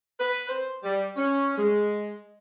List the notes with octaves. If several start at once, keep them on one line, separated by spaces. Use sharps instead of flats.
B4
C5
G3
C#4
G#3